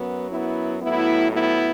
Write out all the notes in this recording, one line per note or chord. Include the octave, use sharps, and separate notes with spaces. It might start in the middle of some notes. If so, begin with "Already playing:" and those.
Already playing: F#2 F#3 B3
B3 E4
A2 F#3 B3 E4
B3 E4